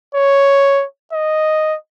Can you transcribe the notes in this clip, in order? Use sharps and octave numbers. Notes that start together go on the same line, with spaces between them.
C#5
D#5